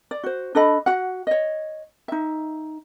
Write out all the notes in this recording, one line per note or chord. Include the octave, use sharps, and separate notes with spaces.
D5
F#4 C5
D4 A4 D#5 B5
F#4 F#5
C#5 D#5
D#4 E5